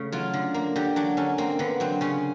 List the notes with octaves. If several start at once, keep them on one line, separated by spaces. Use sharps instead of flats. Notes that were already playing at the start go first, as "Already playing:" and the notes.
Already playing: C#3 A3
F#3 F4
D3
A#3
D3 G4
F#3 D4
D3 C#4
A#3 C4
D3 B3
F#3 C4
C#3 C#4